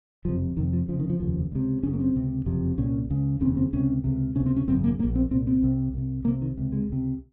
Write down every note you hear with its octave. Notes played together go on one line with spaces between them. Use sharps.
F#1 F2 C3 F3
F1 F2 C3 D#3
F3
F1 F2 C#3 F3
D#3
F3
F1 D#2 C#3 F3
C#2 C3
F#1 F#2 C#3 C#4
A#3
C4
C#2 C3
F#1 F2 C3
C2 A#2 C#4
C#2 C#3
F1 D#2 C#3 C4
C4
C#2 C3 C#4
C#2 C3
C#2 C3 C#4
C4
C#4
G#1 F#2 C#3 C4
A#3
G#2 A#3
A#1
C4
C2 A#2 C4
C4
C2 C3
C2 C3
C2 C3 A#3
D#3
C#2 C3
G#3
C#2 C3